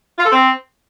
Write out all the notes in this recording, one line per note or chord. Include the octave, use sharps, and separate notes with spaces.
F4
A4
C4